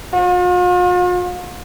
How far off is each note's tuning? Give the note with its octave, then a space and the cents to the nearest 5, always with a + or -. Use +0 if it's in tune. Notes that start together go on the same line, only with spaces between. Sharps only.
F4 +45